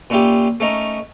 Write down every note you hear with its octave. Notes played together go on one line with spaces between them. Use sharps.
A#2 C#4 E4 F4 G4
A3 C#4 D#4 A#4